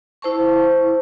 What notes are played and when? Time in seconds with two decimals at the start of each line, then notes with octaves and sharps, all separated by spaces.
0.22 E4 C5 A5 C#6